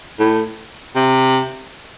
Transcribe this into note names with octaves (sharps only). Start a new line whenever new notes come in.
A2
C3